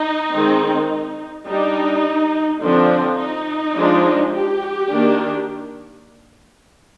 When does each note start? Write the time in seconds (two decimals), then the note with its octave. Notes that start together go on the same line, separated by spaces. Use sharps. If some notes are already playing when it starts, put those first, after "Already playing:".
Already playing: D#4
0.32 D#3 G#3 C4
1.46 G3 D4 D#4
2.61 D3 F3 C4 D4
3.18 D#4
3.75 F3 G#3 D4
4.32 G4
4.90 D#3 A#3 D4